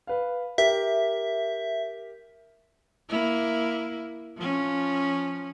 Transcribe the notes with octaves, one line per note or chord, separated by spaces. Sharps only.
B4 F5
G4 A#4 E5
A#3 E4
F3 C#4